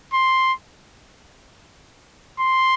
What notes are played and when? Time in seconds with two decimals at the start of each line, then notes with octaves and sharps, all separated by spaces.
0.14 C6
2.39 C6